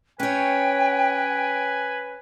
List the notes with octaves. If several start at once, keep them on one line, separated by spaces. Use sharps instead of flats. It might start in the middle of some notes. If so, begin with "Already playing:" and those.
C#4 B4 C#5 G5 G#5